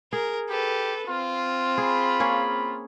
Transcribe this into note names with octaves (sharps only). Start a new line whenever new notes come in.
G#4 A#4
G4 A4 B4
C4 F4
G#4 B5
A#3 C#4 G#4